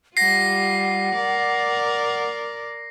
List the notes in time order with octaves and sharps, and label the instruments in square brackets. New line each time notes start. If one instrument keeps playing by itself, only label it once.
[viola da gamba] G3 F4 [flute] F#5 [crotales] A#6 C7
[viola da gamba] A#4 D5